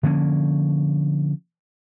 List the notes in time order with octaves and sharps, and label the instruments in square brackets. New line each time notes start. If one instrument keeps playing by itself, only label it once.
[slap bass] D3 F3 A#3 C#4